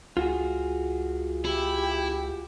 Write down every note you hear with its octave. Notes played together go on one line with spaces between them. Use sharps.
C#2 F4 F#4 G#4
E4 G4